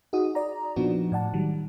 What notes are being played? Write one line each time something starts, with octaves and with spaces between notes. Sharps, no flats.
D#4 F#4 G#4 D#6
D5 A#5
A#2 F3 B3 D4 D#4 F#4
A2 D5 F#5 A5
D#3 F#3 G3